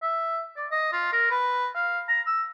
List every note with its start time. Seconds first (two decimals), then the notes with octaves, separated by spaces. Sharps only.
0.02 E5
0.56 D5
0.72 D#5
0.93 F4
1.12 A#4
1.31 B4
1.75 F5
2.08 A#5
2.27 E6